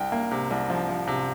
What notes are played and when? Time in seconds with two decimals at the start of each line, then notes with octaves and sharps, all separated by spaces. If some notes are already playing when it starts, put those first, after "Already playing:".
Already playing: C2 G5
0.12 A#3
0.31 C3
0.50 C2
0.70 F3
0.89 F3
1.07 C3